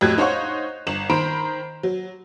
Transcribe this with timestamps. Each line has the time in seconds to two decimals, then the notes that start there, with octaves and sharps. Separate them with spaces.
0.01 F2 A2 F#3 G4 F#6 G#6
0.18 D#4 C5 C#5 F5 F#5 C#6
0.87 G1 E7 F#7
1.10 D#3 C5 A#5 B5 D7
1.83 F#3